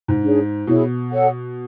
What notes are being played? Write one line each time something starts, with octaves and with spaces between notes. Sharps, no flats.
G#2
D4 G#4 C#5
B2 E4 G#4 C#5
A4 C#5 F#5